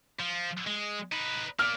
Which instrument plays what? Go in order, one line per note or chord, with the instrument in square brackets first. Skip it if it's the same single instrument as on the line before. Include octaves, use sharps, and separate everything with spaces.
[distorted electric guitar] F3
G#3
D#4 B4
[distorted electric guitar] A#3 D5 [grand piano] F6